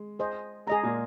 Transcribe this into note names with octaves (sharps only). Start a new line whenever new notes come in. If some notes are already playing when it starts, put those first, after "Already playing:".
Already playing: G#3
G#4 C5 D#5
G#3 G#4 D#5 A#5
A#2 A#3